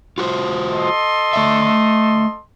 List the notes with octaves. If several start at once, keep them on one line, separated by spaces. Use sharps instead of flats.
F4 F#4 C5
A4 D#5 C6
A3 D5 E5